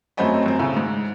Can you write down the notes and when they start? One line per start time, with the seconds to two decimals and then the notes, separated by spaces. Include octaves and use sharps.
0.17 F#2 A3 C4 C#4 D#5 B5
0.46 F#2 C4
0.59 A2 C#3 A3
0.76 G#2